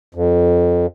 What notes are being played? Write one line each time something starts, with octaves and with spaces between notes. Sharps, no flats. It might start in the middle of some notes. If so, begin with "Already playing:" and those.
F2